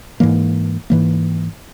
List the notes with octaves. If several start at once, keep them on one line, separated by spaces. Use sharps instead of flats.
G#2 E3 A#3
G#2 E3 A#3